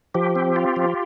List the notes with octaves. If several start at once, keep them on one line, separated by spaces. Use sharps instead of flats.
F3 G4
C4
F4
F3